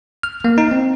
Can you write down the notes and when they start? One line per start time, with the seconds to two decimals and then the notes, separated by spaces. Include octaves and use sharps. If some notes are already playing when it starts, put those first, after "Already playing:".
0.23 F6
0.44 A#3
0.58 D#4
0.71 C4